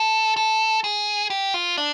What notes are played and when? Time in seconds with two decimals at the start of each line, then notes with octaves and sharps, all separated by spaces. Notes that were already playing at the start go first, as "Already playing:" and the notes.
Already playing: A4
0.37 A4
0.84 G#4
1.30 G4
1.54 F4
1.77 D4